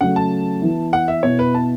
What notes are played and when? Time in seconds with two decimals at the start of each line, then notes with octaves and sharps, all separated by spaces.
0.01 C#3 F#3 A3 F#5
0.16 A5
0.61 E3 B3 E4
0.93 F#5
1.08 E5
1.23 B2 B3 E4 C#5
1.39 B4
1.54 A5